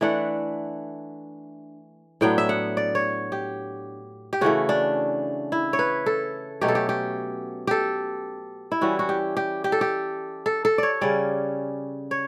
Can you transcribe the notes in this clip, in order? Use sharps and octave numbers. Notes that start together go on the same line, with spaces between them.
E3 A3 D4 F#5
A2 F#3 B3 D4 G5
E5
F#5
D5
C#5
G4
G4
C#3 E3 A3 F#4
D4
E4
C#5
B4
A4
B2 F#3 A3 C#4 G4
A4
G4
G4
G4 A4
E4
E3 G3 C#4 F#4
F#4
G4
G4
G4
A4
G4
A4
A4
C#5 D5
C#3 G3 C#4 D5
C#5